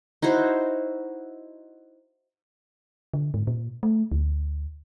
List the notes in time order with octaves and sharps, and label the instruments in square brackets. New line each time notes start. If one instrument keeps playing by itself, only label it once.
[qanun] D#4 E4 F#4 C5
[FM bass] D3
G#2
A#2
A3
D2